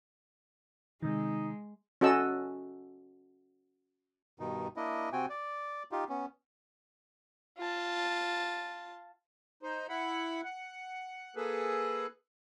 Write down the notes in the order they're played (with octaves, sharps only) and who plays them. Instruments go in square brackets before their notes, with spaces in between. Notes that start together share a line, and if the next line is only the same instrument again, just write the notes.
[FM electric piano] C3 D#3 [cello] G#3 [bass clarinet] D#4
[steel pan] C#4 F#4 A4 D#5 E6
[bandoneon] G2 B2 D#3 D#4
A#3 D4 E4 D#5
C3 C4 F#4 G5 G#5
D5
D#4 F4 G4
B3 C#4
[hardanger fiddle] F4 A5
[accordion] D#4 C5
E4 F#5 B5
F#5
A#3 G#4 A4 B4